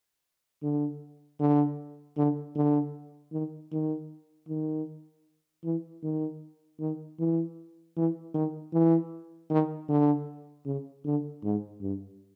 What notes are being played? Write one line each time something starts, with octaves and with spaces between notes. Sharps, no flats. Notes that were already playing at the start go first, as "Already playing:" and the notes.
D3
D3
D3
D3
D#3
D#3
D#3
E3
D#3
D#3
E3
E3
D#3
E3
D#3
D3
C#3
D3
G#2
G2